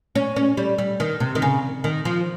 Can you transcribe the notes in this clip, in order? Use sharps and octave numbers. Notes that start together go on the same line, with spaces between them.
C#4
C#4
G3
G3
D#3
C3
D#3
C#3
D#3
F3